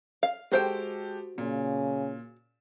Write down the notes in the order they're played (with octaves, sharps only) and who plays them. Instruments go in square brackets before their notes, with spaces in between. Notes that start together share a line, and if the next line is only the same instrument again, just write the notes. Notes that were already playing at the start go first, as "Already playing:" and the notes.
[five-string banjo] F5
[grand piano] G#3 G4 A4 [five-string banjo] F#4 C5 G5
[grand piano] A#2 [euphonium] C#3